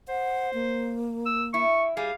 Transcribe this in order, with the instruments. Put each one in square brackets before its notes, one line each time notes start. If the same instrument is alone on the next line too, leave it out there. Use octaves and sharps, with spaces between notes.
[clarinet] C5 [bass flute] F#5
[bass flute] A#3
[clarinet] E6
[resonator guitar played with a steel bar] E4 [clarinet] C#6
[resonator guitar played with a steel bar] G3 G#4 [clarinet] F5